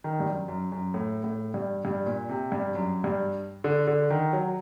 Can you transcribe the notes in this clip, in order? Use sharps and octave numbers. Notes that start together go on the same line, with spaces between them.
D#3
G2
F#2
F#2
F#2
A2
A2
G2
G2
A#2
C3
G2
F#2
G2
D3
D3
D#3
F#3